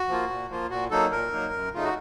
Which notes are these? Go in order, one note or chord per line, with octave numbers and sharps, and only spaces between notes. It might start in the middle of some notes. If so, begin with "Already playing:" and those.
Already playing: F#4
F3 A#3 F4
A#2
F3 A#3 F4
A#2 F#4
F#3 A#3 D#4 A4
A#2 A#4
F#3 A#3 D#4
F#2
C#3 A3 D#4 F4
F#4